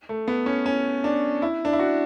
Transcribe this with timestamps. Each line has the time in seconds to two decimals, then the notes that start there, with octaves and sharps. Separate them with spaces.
0.09 A3
0.28 B3
0.46 C#4
0.66 C#4
1.04 D4
1.42 E4
1.65 D4
1.73 E4
1.79 F#4